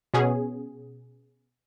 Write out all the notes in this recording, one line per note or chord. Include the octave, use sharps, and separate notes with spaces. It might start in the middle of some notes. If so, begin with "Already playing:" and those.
B2 B3 C#4 G#4